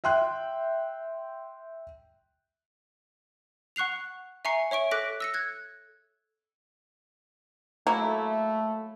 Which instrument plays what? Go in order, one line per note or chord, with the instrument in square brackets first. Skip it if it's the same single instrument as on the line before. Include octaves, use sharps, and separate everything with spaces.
[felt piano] E5 G5 C6 F#6
[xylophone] F#5 C#6 F#6 C7 F7
E5 G#5 A#5 C#6 C7 C#7
C#5 E5 C#6 D7
A4 D6 F#6 A#6 B6 D7
E6 A#6 C#7
F#6 G#6
[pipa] F#3 A#3 E4 [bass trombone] A3